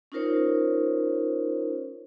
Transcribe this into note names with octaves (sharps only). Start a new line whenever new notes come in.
C#4 D#4 F4 A#4 C5 C#5